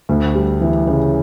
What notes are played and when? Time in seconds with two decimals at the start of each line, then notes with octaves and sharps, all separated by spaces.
0.09 D2
0.35 G3
0.61 E3
0.87 C#3